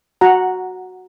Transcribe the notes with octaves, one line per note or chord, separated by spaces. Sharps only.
F#4 F#5 A#5